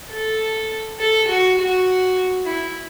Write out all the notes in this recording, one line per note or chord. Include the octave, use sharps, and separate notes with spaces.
A4
A4
F#4
F#4
E4